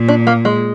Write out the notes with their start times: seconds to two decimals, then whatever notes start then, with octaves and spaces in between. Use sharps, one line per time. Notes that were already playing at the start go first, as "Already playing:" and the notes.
Already playing: A#2
0.08 D4
0.27 A#3
0.45 G#3